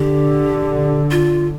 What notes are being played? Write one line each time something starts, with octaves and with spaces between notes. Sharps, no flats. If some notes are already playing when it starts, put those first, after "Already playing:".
Already playing: D3 G4
F4